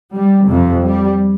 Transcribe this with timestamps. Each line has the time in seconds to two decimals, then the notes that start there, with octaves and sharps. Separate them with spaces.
0.14 G3
0.48 F2 C3
0.84 G3